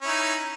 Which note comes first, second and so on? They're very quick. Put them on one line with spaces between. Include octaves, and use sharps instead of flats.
C#4 E4 D#4